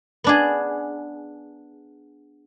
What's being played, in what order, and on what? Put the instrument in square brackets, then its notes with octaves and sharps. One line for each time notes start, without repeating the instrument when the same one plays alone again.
[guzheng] B3 D4 G#4